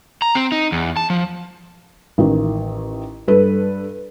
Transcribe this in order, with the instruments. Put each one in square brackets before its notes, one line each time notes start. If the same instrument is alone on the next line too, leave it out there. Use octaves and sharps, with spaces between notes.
[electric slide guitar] A#5
C4
D#4
E2
A5
F3
[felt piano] A1 D#3
G2 A4 B4